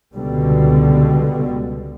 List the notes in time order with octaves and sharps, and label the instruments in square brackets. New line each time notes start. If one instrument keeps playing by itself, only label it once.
[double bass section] C#2 B2 D3 G3